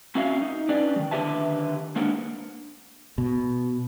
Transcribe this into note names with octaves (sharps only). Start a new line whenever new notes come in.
C4 C#4 F#4 A#4 E5 F5
D#4
C#4 D4 G4 B4 D5
D#3 G3
D3 D#3 G4 B4 E5 A5
G#3 A#3 D4 A#4 F#5
B2